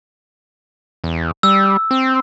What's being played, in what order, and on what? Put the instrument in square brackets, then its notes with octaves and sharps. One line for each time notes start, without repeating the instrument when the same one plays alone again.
[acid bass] E2
[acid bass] G3 [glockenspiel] E6
[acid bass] C4